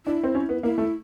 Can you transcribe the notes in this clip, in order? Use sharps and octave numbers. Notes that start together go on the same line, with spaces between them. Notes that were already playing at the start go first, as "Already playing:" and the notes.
D4 E4
C4
C#4
B3
A#3 E4
A3